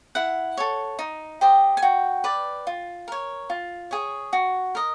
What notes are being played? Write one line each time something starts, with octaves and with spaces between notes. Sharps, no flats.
E4 F#5
A4 C#5
D#4
G4 C5 D#5
G#5
F#4 G5
B4 D5
F4
A#4 C#5
F4
G#4 C#5
F#4
A#4 D#5